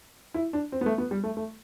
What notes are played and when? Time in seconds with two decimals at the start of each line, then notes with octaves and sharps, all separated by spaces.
0.34 E4
0.53 D4
0.72 C4
0.81 B3
0.86 A3
0.98 B3
1.11 G3
1.23 A3
1.37 A3